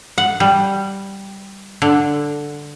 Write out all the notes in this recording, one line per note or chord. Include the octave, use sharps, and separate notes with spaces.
F#5
G3
D3